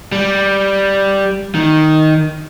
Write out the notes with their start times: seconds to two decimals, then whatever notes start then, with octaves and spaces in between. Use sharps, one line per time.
0.12 G3
1.55 D#3